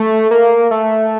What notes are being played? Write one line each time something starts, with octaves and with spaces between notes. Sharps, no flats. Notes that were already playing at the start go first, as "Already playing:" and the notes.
Already playing: A3
A#3
A3